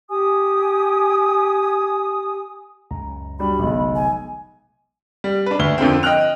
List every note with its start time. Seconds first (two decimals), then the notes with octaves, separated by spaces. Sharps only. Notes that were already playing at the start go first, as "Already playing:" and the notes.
0.10 G4 G#5 D#6
2.91 C#2 F#2 C#3 A#5
3.39 F#3 G3 D4 B5
3.59 F1 B1 B2 D3 G#3 A3
3.95 G#5
5.24 G3
5.46 D4 B4
5.59 D2 G7
5.78 F2 D3 A#3 C4
6.03 D#5 G5 F6 F#6 F7